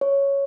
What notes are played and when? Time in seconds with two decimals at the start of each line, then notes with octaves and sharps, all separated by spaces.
0.01 C#5